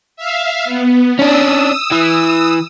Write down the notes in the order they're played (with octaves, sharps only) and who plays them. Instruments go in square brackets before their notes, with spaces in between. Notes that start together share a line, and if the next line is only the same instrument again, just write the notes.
[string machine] E5 F5
B3
[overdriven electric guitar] C#4 D4 [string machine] D#6 E6
[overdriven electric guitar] E3